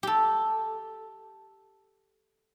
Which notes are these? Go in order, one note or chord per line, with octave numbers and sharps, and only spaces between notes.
G4 A4